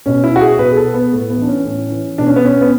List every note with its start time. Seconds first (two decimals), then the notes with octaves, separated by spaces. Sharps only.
0.06 B2 C#4
0.24 E4
0.36 F#4
0.41 G#4
0.59 B2 B4
0.72 G#4
0.77 A4
0.94 B3
1.12 A2 A3
1.30 B3
1.38 E3 D4
1.47 C#4
1.65 A2 C#4
1.92 E3
2.18 B2 D4
2.27 C#4
2.36 B3
2.45 C#4
2.61 B3